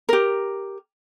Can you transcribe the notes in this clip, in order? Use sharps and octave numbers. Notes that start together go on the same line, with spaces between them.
G4 A#4